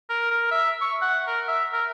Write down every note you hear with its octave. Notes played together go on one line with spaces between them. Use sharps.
A#4
A#4
E5
C#6
F#5
A#4
E5
A#4